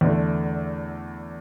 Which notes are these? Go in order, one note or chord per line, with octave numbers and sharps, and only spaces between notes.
E2 D3 A3